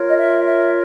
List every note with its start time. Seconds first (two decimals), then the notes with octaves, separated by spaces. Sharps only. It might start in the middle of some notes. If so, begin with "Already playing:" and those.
Already playing: F4 A#4 C#5
0.08 D#5
0.16 E5
0.44 E5